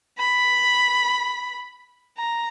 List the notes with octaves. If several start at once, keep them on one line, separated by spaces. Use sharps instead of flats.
B5
A#5